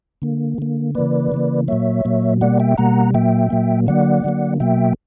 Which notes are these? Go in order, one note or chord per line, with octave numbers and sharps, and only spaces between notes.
D3 A#3
D3 A#3
C#3 E3 A#3 B4 D5
C#3 E3 A#3
A#2 F#3 A#3 C#5 E5
A#2 F#3 A#3
B2 G3 A#3 D5 F#5
E5 G5
B2 G3 A#3 F#5 A#5
A#2 F#3 A#3 E5 G5
A#2 F#3 A#3
D3 F#3 A#3 D5 F#5
D3 F#3 A#3
B2 F#3 A#3 E5 G5